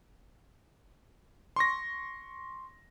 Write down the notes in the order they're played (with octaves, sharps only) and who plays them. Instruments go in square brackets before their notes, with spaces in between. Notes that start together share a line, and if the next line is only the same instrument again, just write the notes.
[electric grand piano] C6 C#6 A#6